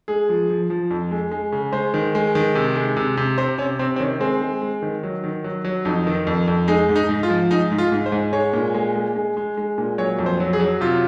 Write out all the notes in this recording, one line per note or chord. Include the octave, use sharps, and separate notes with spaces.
G#3 G#4
F3
F3
F3
F2
G#3
G#3
C#3
G#3 C5
D#3
G#3
D#3
C3
G#3
C3
C3
C3 C5
C3 C#4
C3 C4
C4
D#3 C#4
G#3 C4
G#3
G#3
D#3
F#3
D#3
F#3
F#3
F2 D#4
D#3
F2
F2
G#3 D#4
G#2
D#4
G#2
F4
F3
G#2 D#4
G#2
F4
G#2
C5
G#2
G#3 C#5
A#2
G#3
G#3
G#3
G#3
G#3
A#2
F#3 C#5
F2
C5
F#3
G#4
F#3
C3 F4